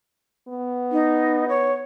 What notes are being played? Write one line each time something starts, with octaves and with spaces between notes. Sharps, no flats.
B3
D#4
C#5